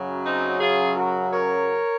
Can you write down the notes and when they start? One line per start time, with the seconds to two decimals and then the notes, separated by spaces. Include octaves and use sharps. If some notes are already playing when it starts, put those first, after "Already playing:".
Already playing: F#2 C#3 F#3
0.26 C4 D#4
0.61 F4 G#4
0.96 F#4 A#4
1.31 A#4 C#5